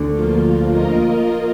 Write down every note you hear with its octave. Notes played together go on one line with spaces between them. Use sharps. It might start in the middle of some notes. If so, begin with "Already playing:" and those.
Already playing: D2 D3
F3 A#3 F4
A#3 F4 A#4 D#5